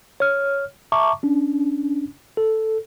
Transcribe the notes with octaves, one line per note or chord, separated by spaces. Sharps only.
C#5 F6
E5 A5 A#5 C#6 D6
C#4 D4
A4